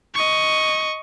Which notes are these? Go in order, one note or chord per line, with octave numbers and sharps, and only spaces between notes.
D#5 C#6